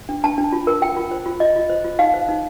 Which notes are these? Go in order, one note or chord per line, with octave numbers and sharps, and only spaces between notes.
D4
D4 A5
D4
F4
A#4
F4 G5
F4
C5
F4
F4 D#5
F4
C5
F4
D#4 F5
C5
D#4